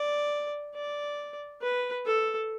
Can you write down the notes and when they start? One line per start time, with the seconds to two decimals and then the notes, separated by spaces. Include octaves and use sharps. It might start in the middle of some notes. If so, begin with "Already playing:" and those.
Already playing: D5
0.75 D5
1.62 B4
2.06 A4